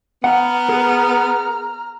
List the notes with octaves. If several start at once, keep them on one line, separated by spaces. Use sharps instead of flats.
B3 F#5 A#5 F6
G#4 A#4